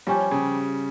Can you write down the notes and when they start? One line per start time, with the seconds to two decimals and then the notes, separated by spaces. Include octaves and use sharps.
0.07 F3 G3 C#4 G4
0.31 C#3